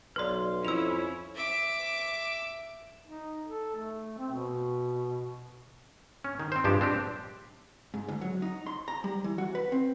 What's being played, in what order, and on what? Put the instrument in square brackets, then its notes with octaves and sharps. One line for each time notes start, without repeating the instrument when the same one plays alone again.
[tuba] B1 [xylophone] B4 D5 [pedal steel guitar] C6 F6
[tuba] F2 [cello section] C#4 E4 C#5 [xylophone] E6 F7
[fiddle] E5 D6
[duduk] D#4
A4
A3
C4
B2
[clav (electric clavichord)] C#4
D#3
C4 C5
G2 F3 G#3 G4 A5
C4 D4 G4
[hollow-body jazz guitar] G#2
D2
F#3
D#4
C6
A#5
G3
E3
F#4
B4
C4